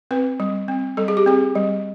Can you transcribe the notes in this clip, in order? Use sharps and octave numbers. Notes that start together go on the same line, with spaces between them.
C4 B4
G3
C4
G3 A4
G#4
G4
C4 G#4
G3